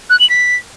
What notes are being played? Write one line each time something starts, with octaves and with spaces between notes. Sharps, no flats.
F#6
F#7
B6